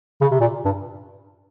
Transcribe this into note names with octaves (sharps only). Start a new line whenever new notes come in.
C#3
C3
A#2
G2